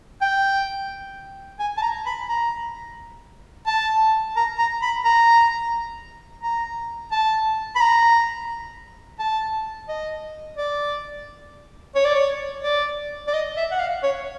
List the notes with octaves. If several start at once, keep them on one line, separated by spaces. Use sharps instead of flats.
G5
G#5
A5
A#5
B5
A#5
A5
A#5
A#5
B5
A#5
A#5
A5
B5
A#5
A5
D#5
D5
C#5
D5
C#5
D5
D5
D#5
E5
F#5
F5
C#5